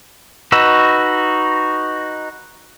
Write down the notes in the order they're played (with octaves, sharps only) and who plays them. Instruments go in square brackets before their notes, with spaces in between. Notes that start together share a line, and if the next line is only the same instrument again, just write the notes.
[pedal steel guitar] D#4 F#4 B4 D#5 E6